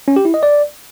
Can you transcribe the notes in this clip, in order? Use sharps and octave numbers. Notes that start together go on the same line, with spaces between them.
C#4
G4
E4
D#5
D5